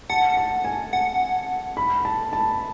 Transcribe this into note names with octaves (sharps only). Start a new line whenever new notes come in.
F#5 A5
A5
G#5
F#5 A5
B5
A5
A5